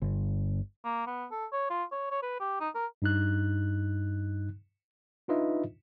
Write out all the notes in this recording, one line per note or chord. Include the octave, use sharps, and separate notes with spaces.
G1
A#3
B3
A4
C#5
F4
C#5
C#5
B4
G4
D#4
A#4
G2 D#4 F#6
D4 D#4 F4 B4 D#5 E5